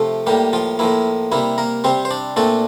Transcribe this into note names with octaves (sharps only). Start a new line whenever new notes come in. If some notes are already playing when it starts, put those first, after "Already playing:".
Already playing: C3 F3 A3 A4
A2 G3 A#3 G4
F3 F4
A2 F3 A#3 E4
C3 G3 A#3 E4
A#3 A#4
C3 G3 C4 C5
C5
D4 D5
A#2 A3 C4 D4 D5